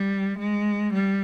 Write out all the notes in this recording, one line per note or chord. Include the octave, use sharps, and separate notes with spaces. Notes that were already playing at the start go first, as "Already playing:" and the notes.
Already playing: G3
G#3
G3